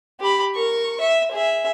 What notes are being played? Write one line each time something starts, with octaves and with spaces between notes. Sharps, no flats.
G4 B5
A#4 C#6
E5
G#4 E5